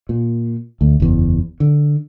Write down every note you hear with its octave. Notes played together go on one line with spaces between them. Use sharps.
A#2
D2
F#1 E2
D3